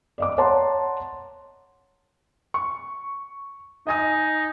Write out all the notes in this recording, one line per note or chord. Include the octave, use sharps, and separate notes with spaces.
D5 D#5 D6
C#5 F#5 A5 A#5 C6
C#6
D#4 D#5 G#5 D#6